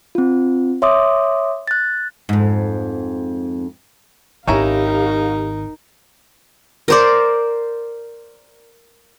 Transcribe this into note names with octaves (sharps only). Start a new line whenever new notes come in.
C4 F4
C#5 E5 C6 D6 D#6
F#6 A6
F2 G#2
G#1 C#4 D#4 E4 G4 A#4 F5 A#5
A#4 C5 D5